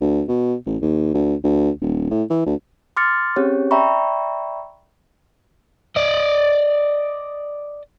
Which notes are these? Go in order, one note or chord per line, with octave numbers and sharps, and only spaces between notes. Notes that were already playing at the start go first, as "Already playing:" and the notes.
D2
B2
A1
D#2
D2
D2
D#1
A2
E3
D2
C6 D6 F6 A6 C#7
C4 C#4 G4 G#4 C#5
D5 E5 G5 A#5 B5 C#6
D5 D#5